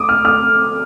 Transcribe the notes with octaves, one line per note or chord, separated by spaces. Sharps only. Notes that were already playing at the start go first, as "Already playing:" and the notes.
Already playing: D6 D#6
F6
F6